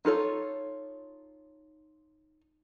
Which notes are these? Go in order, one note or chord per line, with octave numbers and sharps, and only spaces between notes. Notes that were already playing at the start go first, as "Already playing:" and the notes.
D#4 F4 A4 C#5